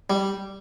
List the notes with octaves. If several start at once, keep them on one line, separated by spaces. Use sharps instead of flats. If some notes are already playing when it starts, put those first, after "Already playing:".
G3